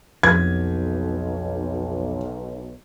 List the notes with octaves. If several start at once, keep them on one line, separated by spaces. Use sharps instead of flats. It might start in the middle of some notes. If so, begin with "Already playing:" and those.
B1 F2 G#6